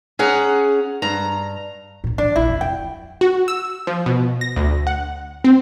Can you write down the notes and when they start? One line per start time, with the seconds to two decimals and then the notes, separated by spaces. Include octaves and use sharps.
0.19 C#4 G#4 F#5 A#5
1.02 G2 A#5
2.04 A2 D3
2.18 E3 D4
2.36 A#1 C#3 E4
2.49 F2 C3
2.61 G5
2.78 F#3
3.21 F#4
3.48 E6
3.87 F3
4.06 B2
4.41 A#6
4.56 D2
4.87 F#5
5.44 C4